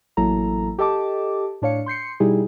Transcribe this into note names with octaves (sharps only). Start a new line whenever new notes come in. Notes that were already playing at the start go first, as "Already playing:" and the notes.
A1 F#3 A#3 E4 A4 A#5
G4 A4 D#5 A5 D6
A2 D4 C#5 F5 C#7
C6 G6 C7 C#7
B2 G3 D#4 E4 G4 G#4